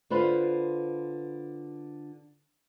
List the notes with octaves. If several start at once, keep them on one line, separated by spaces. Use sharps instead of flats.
D3 F4 B4 C5 F5